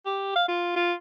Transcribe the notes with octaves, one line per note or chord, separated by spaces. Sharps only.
G4
F5
F4
F4